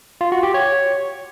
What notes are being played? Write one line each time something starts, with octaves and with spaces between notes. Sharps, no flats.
F4
F#4
G4
C#5